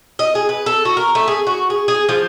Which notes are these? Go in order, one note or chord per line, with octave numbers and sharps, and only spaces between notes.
D#5
G#4
B4
A4
F#4
A#4
A3
G#4
F#4
G#4
G#4
F3